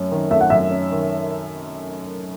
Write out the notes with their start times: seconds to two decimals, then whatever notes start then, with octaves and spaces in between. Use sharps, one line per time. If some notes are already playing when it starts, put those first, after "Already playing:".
Already playing: F#2 A3 C#4
0.12 D#3
0.31 A3 E5
0.41 F#5
0.50 F#2 E5
0.71 C#4
0.92 D#3